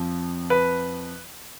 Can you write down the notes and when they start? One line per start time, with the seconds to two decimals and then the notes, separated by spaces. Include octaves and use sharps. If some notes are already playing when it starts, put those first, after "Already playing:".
Already playing: F2 F3
0.50 B4